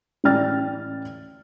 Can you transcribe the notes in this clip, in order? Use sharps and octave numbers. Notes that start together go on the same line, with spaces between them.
A1 D5 G5 F6 A6